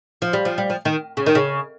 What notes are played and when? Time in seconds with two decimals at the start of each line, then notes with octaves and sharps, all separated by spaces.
0.22 F3
0.33 G3
0.45 F3
0.58 G3
0.70 F3
0.85 D#3
1.17 C#3
1.26 D#3
1.35 C#3